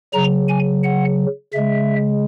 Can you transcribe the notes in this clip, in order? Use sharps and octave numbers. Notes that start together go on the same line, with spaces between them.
C#3 F#3 A#5
G#5
F#5
C#3 G#3 E5